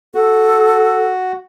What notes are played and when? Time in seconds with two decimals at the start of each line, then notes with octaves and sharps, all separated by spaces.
0.15 F#4 A4